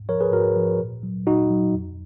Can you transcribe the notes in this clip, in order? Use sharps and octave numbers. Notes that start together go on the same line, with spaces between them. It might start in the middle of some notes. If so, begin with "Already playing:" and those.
Already playing: G#2
F3 A#4 C#5
G#4 B4
G#2 F#4 A#4
F3
A#2
F#3
A#2 D#4 F#4
F#3
F2